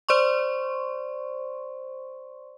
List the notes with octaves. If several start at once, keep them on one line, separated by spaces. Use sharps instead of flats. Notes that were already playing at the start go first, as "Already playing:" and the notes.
C5 D5 C6 C#6